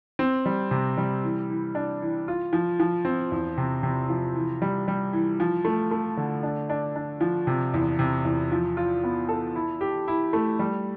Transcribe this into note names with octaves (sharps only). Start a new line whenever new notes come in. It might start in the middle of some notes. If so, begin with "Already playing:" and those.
C4
G3
C3
G3
E3
E3
D4
E3
F4
F3
F3
C4
E2
C3
C3
F3
E3
G3
G3
E3
F3
A3
A3
D3
D4
D4
D4
F3
C3
E2
C3
E2
F3
F4
B3
A4
E4
G4
E4
A3
G3